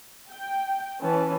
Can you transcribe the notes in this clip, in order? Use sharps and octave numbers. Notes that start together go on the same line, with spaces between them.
G5
E3 C#4 B4 A5